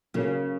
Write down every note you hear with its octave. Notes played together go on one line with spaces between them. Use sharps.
C#3 F#3 A#3 C#4